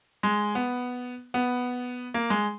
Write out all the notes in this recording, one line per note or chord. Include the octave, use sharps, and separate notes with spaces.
G#3
B3
B3
A#3
G#3